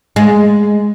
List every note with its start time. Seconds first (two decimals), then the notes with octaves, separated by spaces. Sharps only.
0.16 G#3